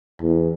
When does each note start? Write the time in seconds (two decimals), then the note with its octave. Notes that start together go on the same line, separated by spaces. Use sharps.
0.21 E2